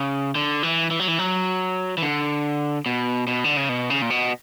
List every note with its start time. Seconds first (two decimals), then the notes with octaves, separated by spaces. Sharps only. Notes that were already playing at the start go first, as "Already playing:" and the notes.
Already playing: C#3
0.35 D3
0.63 E3
0.91 E3
1.00 F#3
1.08 E3
1.19 F#3
1.98 E3
2.02 D3
2.86 B2
3.27 B2
3.44 D3
3.57 C#3
3.69 B2
3.90 C#3
4.02 A#2
4.10 B2